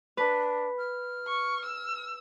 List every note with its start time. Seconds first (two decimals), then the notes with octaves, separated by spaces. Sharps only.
0.17 D4 B4
0.78 F6
1.27 C#6
1.65 E6